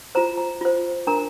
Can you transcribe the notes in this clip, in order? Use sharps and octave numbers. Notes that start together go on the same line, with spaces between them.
F4 C5 A#5
A#5
F4 C5
D4 A#4 A#5